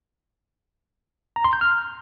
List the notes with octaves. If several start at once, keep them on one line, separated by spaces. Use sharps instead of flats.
A#5
C6
G6
F6